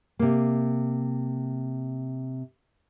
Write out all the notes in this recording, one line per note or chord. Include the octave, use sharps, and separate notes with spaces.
C3 A#3